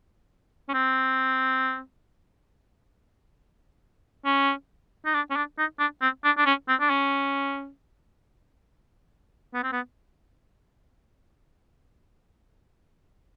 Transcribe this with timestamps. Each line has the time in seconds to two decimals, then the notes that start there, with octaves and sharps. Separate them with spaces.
0.69 C#4
0.74 C4
4.26 C#4
5.06 D#4
5.14 D4
5.31 C#4
5.36 D4
5.58 D#4
5.79 D4
6.02 C4
6.24 D4
6.37 D4
6.46 C#4
6.68 C4
6.80 D4
6.90 C#4
9.54 B3
9.63 C4
9.72 B3